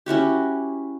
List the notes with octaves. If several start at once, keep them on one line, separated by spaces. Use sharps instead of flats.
C#4 E4 F#4 G4